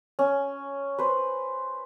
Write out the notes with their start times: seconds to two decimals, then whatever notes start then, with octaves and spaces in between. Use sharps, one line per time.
0.19 C#4
0.98 B4 C5